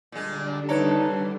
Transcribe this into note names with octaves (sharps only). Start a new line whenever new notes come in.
A#2 D3 G3 G#3 D4
D#2 D#4 A4 B4 C#5 A#5